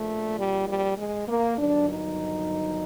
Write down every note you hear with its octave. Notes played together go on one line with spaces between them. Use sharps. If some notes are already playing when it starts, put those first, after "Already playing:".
Already playing: A#1 A#2 F3 A3
G3
G3
G#3
A#3
G1 G2 D#3 F#3 D4
D#4